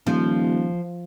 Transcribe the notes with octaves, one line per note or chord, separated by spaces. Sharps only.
D#1 F3